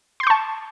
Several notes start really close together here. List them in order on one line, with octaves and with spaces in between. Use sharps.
C6 G6 C#6 A5